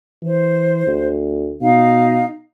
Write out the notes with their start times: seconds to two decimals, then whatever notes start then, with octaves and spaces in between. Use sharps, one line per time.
0.22 E3 C5
0.87 D2
1.61 B2 D#4 F5